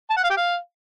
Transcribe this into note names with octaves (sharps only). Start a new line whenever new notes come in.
A5
F#5
F5
G4
F5